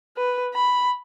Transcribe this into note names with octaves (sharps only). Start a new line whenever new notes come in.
B4
B5